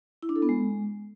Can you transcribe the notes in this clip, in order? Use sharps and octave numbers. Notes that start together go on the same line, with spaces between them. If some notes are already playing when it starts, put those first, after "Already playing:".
E4
D4
A4
B3
G#3